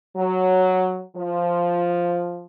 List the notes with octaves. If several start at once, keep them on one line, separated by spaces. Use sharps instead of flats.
F#3
F3